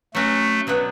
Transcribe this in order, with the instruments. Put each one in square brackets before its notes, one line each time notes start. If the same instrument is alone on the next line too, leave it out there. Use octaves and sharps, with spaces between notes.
[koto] F#3 C#4 F#4 [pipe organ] A3
[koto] B2 F#3 B3 D4